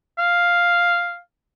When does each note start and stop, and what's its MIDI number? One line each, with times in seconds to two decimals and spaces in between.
0.18 1.19 77